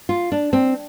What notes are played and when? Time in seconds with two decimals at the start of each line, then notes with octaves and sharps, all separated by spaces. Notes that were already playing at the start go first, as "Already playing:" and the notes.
0.09 F4
0.32 D4
0.53 C4